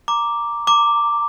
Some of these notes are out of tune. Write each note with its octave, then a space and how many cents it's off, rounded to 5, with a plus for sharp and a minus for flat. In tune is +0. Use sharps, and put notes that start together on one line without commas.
A#5 +0 D6 +0
A#5 -20 D6 +0